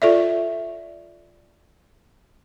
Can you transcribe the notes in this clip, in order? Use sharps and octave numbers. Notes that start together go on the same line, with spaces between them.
F4 A4 D5 E5